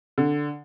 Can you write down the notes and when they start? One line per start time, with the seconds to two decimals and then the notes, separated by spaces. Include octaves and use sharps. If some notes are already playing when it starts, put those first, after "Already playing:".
0.18 D3